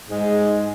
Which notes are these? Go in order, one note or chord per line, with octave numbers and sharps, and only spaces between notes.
G#2 G#3